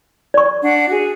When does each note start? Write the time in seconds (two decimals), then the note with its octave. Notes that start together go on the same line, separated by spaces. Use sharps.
0.34 D5 C#6
0.63 D4 F#5
0.87 F#4 G#4